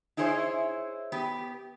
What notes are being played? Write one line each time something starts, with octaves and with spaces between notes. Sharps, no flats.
D#4 E4 G#4 C5 C#5
B3 G4